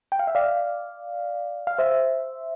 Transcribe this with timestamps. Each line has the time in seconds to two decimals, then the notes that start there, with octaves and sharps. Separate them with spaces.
0.12 G5
0.19 F5
0.27 E5
0.35 D5 F5
1.67 F5
1.78 C5 E5